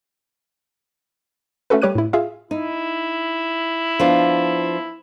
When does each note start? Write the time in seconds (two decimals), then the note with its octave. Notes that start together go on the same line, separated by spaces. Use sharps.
1.70 A3 C#4 F#4 A4 B4
1.82 G3 G4 C#5 D6 F#6 D#7
1.95 A2 E4
2.13 F4 G#4 E5 F5
2.51 D#4 E4
4.00 F3 B3 D4